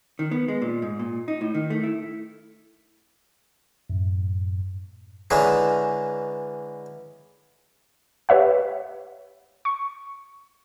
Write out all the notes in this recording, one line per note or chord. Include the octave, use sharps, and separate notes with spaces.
D#3
B3
G#3
A#2
G#2
A#2
D#4
A2
D#3
A3
E4
F#2 A2
D3 E3 G#3 C#4 D#4
G4 B4 C#5 E5 F#5
C#6